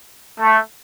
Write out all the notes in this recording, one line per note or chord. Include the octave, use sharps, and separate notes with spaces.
A3